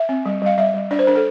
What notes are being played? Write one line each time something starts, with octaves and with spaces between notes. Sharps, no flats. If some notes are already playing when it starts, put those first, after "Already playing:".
Already playing: E5
C4
G3
G3 F5
G3 E5
G3
D4 D5
C5
D4 A#4
A4